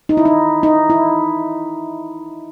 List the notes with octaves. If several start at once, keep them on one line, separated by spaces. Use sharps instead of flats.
D#4
E4
D#4
D#4
E4